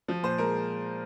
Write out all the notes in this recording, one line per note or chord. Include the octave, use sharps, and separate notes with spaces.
F3
A#2 C5
G#3 A#4